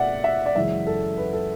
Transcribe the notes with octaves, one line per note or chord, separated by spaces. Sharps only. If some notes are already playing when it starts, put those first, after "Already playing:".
Already playing: B2 A3 D5 E5 F#5
E5
D5
F#2 C#3 E3 G#3 E5
A4
B4
A4